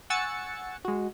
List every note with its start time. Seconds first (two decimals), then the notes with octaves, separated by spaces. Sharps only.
0.10 F#5 G#5 C#6 E6 A6 C#7
0.85 G#3 F#4